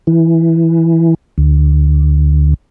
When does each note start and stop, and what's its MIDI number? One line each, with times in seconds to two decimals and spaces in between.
0.07 1.14 52
1.38 2.54 38